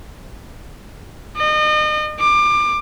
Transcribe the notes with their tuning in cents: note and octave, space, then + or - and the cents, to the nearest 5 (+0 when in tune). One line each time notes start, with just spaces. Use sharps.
D#5 -35
D6 +25